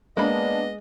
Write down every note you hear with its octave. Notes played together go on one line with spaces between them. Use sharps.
G#3 A#3 B3 D4 D#5 B5